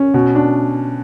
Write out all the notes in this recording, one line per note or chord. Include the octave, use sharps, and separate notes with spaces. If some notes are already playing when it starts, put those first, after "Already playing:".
Already playing: C#4
B2
D4